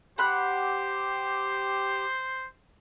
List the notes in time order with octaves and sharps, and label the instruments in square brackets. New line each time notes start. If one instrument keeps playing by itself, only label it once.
[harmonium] G4 [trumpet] C5 [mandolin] F#5 B5 F#6